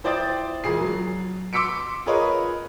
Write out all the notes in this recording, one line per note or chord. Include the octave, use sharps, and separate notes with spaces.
E4 C5 D5 G5 D#6 A6
E1 A#2 G#4 C7
F#3
C6 D6 E6 B6 C#7 D7
F4 G#4 A#4 B4 C#5 D#5